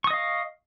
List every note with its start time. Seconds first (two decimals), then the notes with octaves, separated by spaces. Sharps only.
0.04 C#6
0.07 D#6
0.10 D#5
0.13 F5